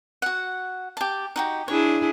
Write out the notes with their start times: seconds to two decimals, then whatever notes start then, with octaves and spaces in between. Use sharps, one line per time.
0.22 F#4 F#5
0.97 G4 A5
1.36 D#4 F#4 G4
1.68 D4 E4 G#4 C#5